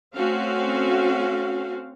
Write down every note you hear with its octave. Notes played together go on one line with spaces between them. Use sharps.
A3 C4 C#4 F#4 F5